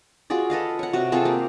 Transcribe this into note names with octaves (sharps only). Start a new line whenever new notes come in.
F4 F#4 G#4 D5
A4 B4 D#5 F5
C#5 F#5
C3 F#4
C4 F4 G#4 A4
A#3 G4